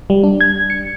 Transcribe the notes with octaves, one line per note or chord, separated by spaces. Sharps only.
G3
D4
G#6
C#7